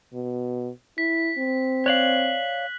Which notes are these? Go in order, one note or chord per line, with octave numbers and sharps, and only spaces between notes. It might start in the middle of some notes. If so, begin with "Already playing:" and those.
B2
E4 B6
C4
C#5 D5 F5 F#6 F#7